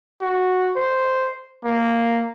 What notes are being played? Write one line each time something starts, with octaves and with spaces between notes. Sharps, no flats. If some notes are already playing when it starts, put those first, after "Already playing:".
F#4
C5
A#3